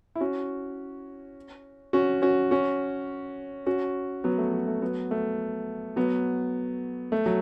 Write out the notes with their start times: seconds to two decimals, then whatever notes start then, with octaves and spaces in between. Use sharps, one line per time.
0.15 E4
0.21 C#4 F#4
1.93 C#4 F#4
2.22 C#4 F#4
2.51 C#4 F#4
3.66 C#4 F#4
4.24 F#3 B3
4.38 A3
4.53 F#3
4.67 A3
4.82 F#3 B3
5.11 A3
5.96 F#3 B3
7.12 A3
7.26 F#3